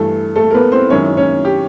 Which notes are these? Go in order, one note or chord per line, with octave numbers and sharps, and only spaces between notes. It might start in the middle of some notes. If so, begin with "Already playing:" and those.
Already playing: G2 E3 A3 A4
A3 A4
A#4
B3 B4
C4 C5
F#2 D#3 G#3 C#4 E4 C#5
C#4 C#5
G4